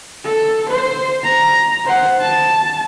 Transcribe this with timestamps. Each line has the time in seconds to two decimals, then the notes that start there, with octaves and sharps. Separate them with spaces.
0.25 A4
0.69 C5
1.23 A#5
1.86 C5 F#5
2.21 A5